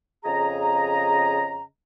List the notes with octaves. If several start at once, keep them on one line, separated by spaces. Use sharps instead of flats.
F2 C#3 G#4 D#5 A#5